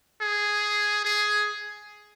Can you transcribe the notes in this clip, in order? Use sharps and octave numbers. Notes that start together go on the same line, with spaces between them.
G#4
G#4